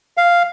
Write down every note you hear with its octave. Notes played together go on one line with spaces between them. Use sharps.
F5